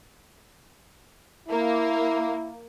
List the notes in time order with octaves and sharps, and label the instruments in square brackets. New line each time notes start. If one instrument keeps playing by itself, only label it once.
[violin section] A#3 [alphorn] E4